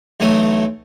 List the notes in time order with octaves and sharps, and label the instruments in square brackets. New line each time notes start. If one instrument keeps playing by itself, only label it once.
[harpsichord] B1 E3 F#3 A3 D#6